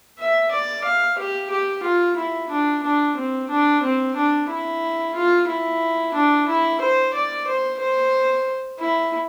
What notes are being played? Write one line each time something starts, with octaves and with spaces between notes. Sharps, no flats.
E5
D5
F5
G4
G4
F4
E4
D4
D4
C4
D4
C4
D4
E4
F4
E4
D4
E4
C5
D5
C5
C5
E4